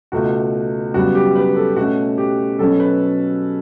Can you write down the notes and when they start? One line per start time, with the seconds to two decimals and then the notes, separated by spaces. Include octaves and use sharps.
0.12 C#2 B2 A3 F#4
0.94 F#2 C#3 G3 B3 F#4
1.15 G4
1.36 B4
1.56 A4
1.76 B2 A3 C#4 F#4
2.18 G4
2.59 B2 F#3 C#4 A4
2.80 B4